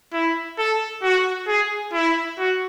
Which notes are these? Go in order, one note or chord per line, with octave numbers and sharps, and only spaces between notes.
E4
A4
F#4
G#4
E4
F#4